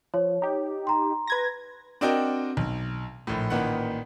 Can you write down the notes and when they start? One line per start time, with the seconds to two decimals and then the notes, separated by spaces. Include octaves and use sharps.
0.14 F3 C#5
0.42 D#4 G4
0.87 A#5 C6
1.28 B4 G#6 A#6
2.01 C4 D4 F#4 A#4 D#5 G5
2.57 B1
3.27 A#1 A2
3.50 A1 A#2 D#3 B4 F#5